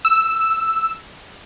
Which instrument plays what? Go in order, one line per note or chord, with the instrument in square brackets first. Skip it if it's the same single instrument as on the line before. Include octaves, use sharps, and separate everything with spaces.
[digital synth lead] E6